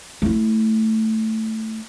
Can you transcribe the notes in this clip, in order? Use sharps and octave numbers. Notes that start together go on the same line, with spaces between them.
A3 E4